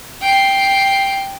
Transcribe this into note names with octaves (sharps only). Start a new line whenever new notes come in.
G5 C7